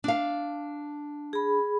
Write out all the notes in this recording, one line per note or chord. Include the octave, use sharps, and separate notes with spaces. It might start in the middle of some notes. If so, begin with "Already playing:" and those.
D4 F5
G#4 B5